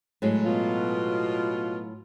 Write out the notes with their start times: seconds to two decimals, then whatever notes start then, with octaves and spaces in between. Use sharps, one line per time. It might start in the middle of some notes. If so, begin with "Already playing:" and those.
0.22 A2 F#3 G#3
0.45 B2 F4